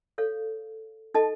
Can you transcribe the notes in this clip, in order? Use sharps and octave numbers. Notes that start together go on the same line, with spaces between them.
A4 C#5 F5
D#4 A4 D#5 A5